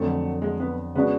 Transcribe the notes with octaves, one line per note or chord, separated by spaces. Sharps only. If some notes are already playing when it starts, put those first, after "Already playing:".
Already playing: F2 D3 F#3 A3
G#3
B3
C#3 G#3 B3 D4 F#4